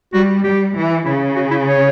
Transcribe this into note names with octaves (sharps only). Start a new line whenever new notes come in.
G3 F#4
G3 G4
E3
C#3 E4
F#4
E4
C#5